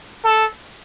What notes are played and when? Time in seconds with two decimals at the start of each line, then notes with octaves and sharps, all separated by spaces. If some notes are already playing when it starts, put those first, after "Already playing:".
0.24 A4